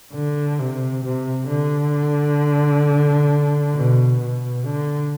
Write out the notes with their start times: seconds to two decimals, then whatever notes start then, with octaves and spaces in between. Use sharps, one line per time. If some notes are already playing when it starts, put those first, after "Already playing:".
0.14 D3
0.59 C3
1.04 C3
1.49 D3
3.75 B2
4.20 B2
4.66 D3